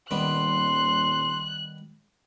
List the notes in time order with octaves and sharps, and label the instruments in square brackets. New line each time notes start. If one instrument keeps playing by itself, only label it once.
[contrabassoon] D#1 [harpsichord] D#3 G3 B3 [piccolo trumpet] C6 [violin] F#6